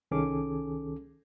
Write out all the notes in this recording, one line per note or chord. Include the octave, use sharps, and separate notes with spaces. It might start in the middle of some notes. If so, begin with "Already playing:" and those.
C2 D#3 C#4 G#4 A4 D6